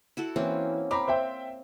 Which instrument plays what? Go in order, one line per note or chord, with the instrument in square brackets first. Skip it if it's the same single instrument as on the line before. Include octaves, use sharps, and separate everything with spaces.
[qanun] E4 F#4 A4
[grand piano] E3 [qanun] A#3 C4 C#4
[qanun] C4 F5 [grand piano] A#5 B5 D6
[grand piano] C5 E5 G5